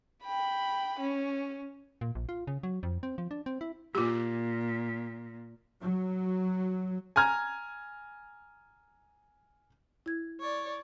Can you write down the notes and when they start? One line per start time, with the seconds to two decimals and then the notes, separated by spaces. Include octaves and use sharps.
0.24 G5 B5
1.00 C#4
2.01 A#2
2.15 A#1
2.29 F4
2.47 C#3
2.63 F#3
2.83 F2
3.03 C4
3.18 F3
3.31 D4
3.46 C4
3.61 E4
3.95 A#2 F4 G4
5.81 F#3
7.16 G#5 A#5 F6 G#6
10.06 E4 G#6
10.41 C#5 D5